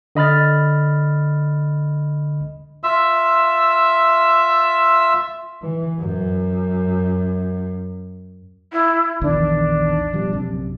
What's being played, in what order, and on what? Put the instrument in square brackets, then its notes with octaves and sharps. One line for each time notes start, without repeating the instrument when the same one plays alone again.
[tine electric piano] D3 D#5 B5 F6 A6
[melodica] F4 E5 E6
[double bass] E3
F#2
[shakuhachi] E4
[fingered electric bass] A#1 E2 D#3 [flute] D4
[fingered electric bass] B2 F3 G3
A#1 F#2 C3